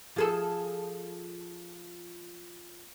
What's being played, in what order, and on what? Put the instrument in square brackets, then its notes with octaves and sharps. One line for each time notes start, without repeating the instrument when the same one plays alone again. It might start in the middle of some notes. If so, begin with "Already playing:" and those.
[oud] F3 G#4 A4